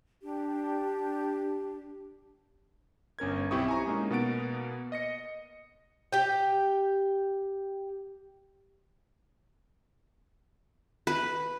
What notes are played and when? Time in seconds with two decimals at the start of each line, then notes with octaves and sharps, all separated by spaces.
0.22 D4 G4
3.19 G1 C#4 A#4 G#6
3.51 B1 C4 E4 G4 C#6 D#6
3.68 G#5 A#5 C#6
3.87 G#3 A#3 C#4 D#4
4.10 B2 A#3 B3 F#5 A6 D7
4.92 D#5 A#6 C#7
6.13 G4 G5
11.07 B4